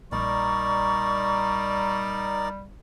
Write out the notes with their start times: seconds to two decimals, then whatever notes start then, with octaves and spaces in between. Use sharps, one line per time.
0.12 A#1 G3 D#4 A#4 D5 C#6